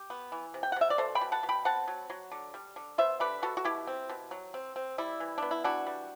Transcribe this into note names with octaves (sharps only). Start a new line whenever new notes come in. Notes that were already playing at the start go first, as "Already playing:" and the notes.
Already playing: G4
B3
E3
C3
G5
F#5
C3 E5
D5
B2 A4 C5
G5 B5
B2
F#5 A5
B2
G5 B5
C4 F#5 A5
F#3
F#3
D3
G3
D3
B3 C5 E5
D3 G4 B4
B3 F#4 A4
F#4
B2 E4 G4
C4
B2
F#3
C4
C4
G3 E4
E3
B3 D4
E4
E3 D4 F#4
G3